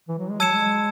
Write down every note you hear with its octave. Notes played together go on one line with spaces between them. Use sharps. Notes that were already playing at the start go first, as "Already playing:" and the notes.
E3
F#3
G#3
F#3 A5 E6 G#6 C#7 E7
G#3